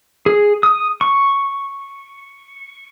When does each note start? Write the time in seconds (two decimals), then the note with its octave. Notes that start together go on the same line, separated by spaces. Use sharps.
0.26 G#4
0.63 D#6
1.01 C#6